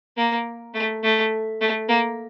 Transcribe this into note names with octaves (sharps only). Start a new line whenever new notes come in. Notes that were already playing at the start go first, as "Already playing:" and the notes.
A#3
A3
A3
A3
A#3